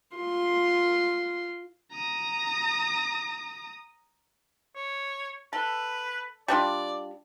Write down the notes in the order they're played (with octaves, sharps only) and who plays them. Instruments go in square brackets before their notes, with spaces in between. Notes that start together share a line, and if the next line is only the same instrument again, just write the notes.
[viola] F4 C6
[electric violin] A#5 D#6
[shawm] C#5
[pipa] A4 [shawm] B4
[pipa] G3 D4 F4 [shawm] D5